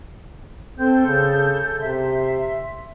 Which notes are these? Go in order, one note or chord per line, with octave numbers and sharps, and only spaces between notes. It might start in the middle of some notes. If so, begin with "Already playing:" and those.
C4 A4 G6
C#3
C3 E5 C6